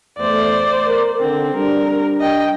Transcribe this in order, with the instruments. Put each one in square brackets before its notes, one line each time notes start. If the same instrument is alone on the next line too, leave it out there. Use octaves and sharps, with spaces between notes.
[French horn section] E2 A3 [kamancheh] C5 D5
[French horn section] A#4
[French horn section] D3 [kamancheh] C4
[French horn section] G3 D4 [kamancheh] A#4
[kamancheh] D#5 G5